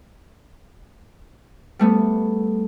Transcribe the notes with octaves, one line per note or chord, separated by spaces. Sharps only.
G3 A3 B3